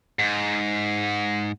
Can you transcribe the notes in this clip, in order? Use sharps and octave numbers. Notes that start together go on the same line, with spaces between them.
G#2